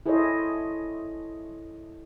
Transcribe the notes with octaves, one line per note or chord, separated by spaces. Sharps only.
E4 G#4 A4 C5 C#5 D#5